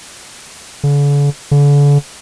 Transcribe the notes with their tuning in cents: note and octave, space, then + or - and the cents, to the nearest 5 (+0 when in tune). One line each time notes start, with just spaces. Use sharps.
D3 -45
D3 -40